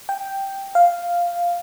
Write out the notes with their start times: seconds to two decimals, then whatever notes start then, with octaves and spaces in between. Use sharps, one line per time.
0.09 G5
0.75 F5